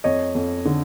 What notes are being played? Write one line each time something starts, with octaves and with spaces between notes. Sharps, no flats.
F2 C#5 D#5
F2
D3